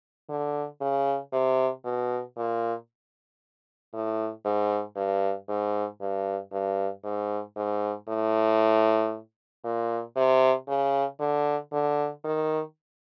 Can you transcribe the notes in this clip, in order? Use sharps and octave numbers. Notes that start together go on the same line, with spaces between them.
D3
C#3
C3
B2
A#2
A2
G#2
G2
G#2
G2
G2
G#2
G#2
A2
A#2
C3
C#3
D3
D3
D#3